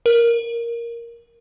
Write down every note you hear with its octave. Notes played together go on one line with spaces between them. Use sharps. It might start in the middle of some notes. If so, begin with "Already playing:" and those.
A#4